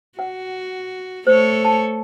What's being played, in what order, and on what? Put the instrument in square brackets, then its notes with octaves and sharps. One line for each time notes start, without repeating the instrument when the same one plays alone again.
[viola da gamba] F#4 [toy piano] F#5
[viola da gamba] A3 A4 C#5 [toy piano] C5
[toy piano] A5